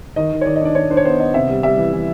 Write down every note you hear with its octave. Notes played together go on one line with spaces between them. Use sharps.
D#3 D#5
D#3
C#5
D#3 D5
D#5
D4 D5
D4 C#5
D4 C5
C#5
B3 C5
B3 D#5
C3 E5
G3
G3 E5
E3
E3